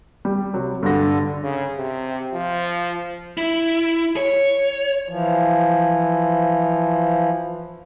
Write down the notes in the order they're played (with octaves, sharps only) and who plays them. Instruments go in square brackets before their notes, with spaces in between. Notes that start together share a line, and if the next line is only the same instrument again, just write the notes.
[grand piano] G3
C3 F#3
[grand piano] G2 A#6 [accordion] D3
[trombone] C#3
C3
F3
[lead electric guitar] E4
C#5
[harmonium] E3 F3